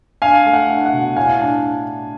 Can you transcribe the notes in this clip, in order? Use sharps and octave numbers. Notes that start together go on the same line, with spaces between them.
D4 F5 G#5
A3
F#5
D4
F#5
B2
A2 F5 G#5
D4